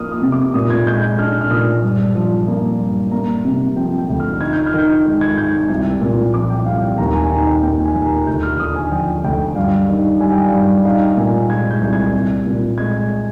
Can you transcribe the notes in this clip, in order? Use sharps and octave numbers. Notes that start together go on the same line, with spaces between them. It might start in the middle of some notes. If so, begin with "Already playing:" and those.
Already playing: F3 A#3 D#6 F6
D#6
C3
D6
A#2 D#6
G#6
G#3 G6
G6
D4 F6
F6
A#2 D#6
G2
F3
A#3
G2
A#3 A#5
C3
F3 G5
G5
D2
F6
D#4 G#6
G6
F6
D#3 G6
G#3
G#6
G#2 G6
C2
A#2
F3 D6
G5
C2 F5
G5
D#2 A#5
G#5
D#3 A#5
G5
A#3 G5
G#5
D#2
A#5
D2 G6
F6
D3 D#6
G#5
F3 G5
D2 G5
G2 F5
D#3
G3 G#5
G5
F5
G2 G5
D#4 F5
G5
A#2 G#5
G#3 G#6
G6
C2
G#6
C2
A#2
G#3 G#6